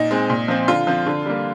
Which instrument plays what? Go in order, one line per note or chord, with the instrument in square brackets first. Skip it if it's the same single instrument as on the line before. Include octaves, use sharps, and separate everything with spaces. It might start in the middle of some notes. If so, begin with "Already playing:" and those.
Already playing: [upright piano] A#2 D#4
G#3 C4
A#2
F3 C4
D3 F4
F3 C4
D3
G3 A#3